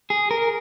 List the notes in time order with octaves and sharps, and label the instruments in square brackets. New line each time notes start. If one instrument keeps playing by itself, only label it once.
[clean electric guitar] G#4
A#4